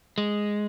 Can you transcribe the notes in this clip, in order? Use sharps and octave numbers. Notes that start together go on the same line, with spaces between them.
G#3